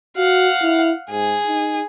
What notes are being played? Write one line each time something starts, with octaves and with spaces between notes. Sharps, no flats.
F#4 F5 F#5
E4
G#2 G#4
D#4